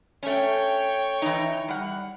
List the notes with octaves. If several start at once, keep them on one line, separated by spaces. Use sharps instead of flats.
A3 C#4 C#5 G5
E3 D#4
G3 F#5